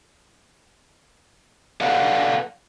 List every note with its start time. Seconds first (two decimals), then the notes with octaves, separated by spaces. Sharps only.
1.81 A4 B4 D5 F5 F#5